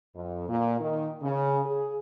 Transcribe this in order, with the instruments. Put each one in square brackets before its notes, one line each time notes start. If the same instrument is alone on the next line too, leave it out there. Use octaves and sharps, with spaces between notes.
[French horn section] F2
A#2
D#3
C#3
G#4